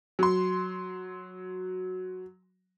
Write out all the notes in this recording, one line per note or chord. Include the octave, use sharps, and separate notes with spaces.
F#3 C6